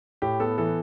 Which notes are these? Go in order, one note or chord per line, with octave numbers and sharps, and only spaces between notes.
A2 G4
B3 A4
E3 A4